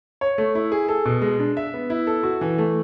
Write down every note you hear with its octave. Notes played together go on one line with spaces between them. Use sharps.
C#5
A3
E4
G#4
A4
B2
G#3
D4
E5
B3
E4
A4
F#4
E3
A3